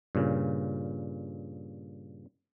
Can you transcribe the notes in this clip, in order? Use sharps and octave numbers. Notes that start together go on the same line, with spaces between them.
G2 A#2 C#3